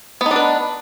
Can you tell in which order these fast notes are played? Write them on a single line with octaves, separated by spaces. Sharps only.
B3 D#4 D4 B4